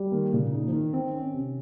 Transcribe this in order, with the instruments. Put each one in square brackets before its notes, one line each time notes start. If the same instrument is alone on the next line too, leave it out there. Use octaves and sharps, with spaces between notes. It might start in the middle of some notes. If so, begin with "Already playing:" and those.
Already playing: [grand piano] G3
[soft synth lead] D#3 [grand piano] A#3
[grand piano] A#2 [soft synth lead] C#3
[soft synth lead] C#3 [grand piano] D#4
[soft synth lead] F3
[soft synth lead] D#3 [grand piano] D#4
[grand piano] D#3 [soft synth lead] C4
[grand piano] C#4
C3